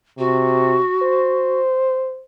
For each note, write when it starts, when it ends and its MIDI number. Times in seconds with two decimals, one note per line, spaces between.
0.18 0.80 48
0.18 1.60 66
1.03 2.23 72